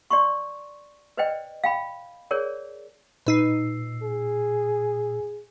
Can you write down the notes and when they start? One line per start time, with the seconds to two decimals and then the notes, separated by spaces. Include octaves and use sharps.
0.11 D5 C6 C#6
1.17 B4 C5 D5 D#5 G5
1.64 F5 G5 B5
2.31 G#4 A#4 C#5 D5
3.26 A#2 D#4 B4 E6 C7
4.03 G#4